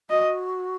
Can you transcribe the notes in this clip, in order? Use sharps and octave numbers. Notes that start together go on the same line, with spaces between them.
F#4 D#5